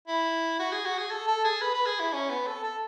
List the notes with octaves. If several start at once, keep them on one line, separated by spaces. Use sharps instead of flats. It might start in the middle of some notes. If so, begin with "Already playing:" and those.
E4
F#4
G#4
F#4
G#4
A4
A4
G#4
B4
B4
G#4
E4
C#4
B3
A4
A4